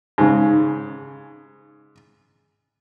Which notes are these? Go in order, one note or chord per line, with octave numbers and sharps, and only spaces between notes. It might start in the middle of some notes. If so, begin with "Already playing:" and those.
G#2 C#3